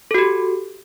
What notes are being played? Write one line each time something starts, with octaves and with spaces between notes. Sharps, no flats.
F#4 G4 A4